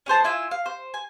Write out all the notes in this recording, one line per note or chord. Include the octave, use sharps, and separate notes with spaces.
C#4 G#4 C5 A5
E4 F4 G#5 E6
F5
C5
G#5